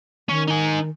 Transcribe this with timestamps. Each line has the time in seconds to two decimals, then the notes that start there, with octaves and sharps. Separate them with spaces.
0.29 D#3 C#4
0.48 D#4 G#5